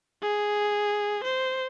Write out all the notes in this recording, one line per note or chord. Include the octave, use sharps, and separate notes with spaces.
G#4
C5